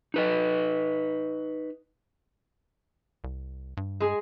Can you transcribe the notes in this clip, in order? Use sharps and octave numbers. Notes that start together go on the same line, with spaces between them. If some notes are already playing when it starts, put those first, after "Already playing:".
D#4 B4 D#5
C2
G2
G#3 G#4